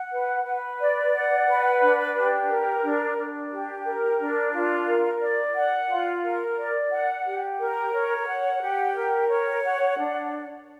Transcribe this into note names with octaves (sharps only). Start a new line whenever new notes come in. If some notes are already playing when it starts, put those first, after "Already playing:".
Already playing: F#5
B4
B4
D5
F#5
B4
D4
G4
A#4
D4
D4
G4
A#4
D4
F4
A#4
D5
F#5
F4
A#4
D5
F#5
G4
A#4
C#5
F#5
G4
A#4
C#5
F#5
D4